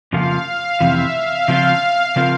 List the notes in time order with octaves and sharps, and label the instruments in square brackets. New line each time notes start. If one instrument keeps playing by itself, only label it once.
[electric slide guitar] F2 C#3 F3 A#3 F4 [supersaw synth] F5
[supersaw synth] F5
[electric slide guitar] F2 C3 E3 [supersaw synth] E5
[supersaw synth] F5
[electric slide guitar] C#3 F3 C4 F4
C#3 F3 C4 F4 A#4